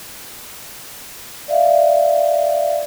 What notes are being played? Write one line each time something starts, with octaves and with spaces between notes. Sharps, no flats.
D5 E5 F5